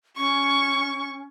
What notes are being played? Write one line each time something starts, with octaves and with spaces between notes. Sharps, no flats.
C#4 C#6